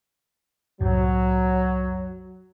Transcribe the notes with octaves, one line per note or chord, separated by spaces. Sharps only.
C2 F#2 A2 F#3